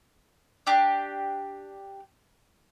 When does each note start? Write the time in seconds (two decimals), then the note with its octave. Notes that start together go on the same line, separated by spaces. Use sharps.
0.67 D4 G4